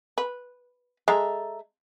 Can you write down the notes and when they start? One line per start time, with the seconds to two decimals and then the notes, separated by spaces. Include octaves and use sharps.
0.18 B4
1.08 G#3 A4 E5 A#5